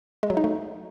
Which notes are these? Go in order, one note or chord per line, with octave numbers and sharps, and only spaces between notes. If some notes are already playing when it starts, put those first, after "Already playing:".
G#3
F#3
D#4
A3